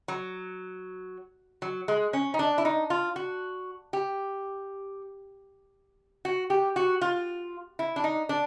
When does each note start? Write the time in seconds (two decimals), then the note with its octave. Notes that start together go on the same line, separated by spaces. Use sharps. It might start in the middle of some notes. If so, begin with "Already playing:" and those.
0.08 F#3
1.62 F#3
1.88 G#3
2.13 C#4
2.34 D#4
2.39 D4
2.58 E4
2.65 D#4
2.90 F4
3.16 F#4
3.93 G4
6.25 F#4
6.50 G4
6.76 F#4
7.01 F4
7.79 E4
7.96 D4
8.04 D#4
8.29 D4